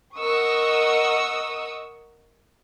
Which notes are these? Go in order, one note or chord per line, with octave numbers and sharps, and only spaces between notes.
A#4 D#5 F#5 C#6 D#6 E6